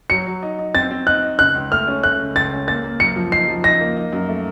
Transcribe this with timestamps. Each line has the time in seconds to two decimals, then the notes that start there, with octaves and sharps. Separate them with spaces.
0.10 F#3 C#7
0.26 F#3
0.43 D#4
0.59 D#4
0.75 C4 A6
0.91 C4
1.07 D#4 F#6
1.23 D#4
1.39 C#3 F#6
1.55 C#2
1.72 A3 F6
1.87 C#4
2.03 A3 F#6
2.20 C#3
2.36 C#2 A6
2.52 C#4
2.67 A#3 A6
2.84 A#3
3.00 F#2 C#7
3.16 F3
3.32 D#4 C7
3.48 F3
3.64 D#4 A#6
3.80 A#3
3.96 D#4
4.13 F#2
4.29 A3